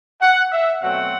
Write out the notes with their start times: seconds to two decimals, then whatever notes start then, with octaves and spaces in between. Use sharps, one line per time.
0.21 F#5
0.51 E5
0.81 B2 F#3 A3 C4 F#5